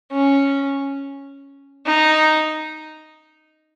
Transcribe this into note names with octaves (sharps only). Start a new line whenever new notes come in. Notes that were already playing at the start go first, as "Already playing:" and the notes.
C#4
D#4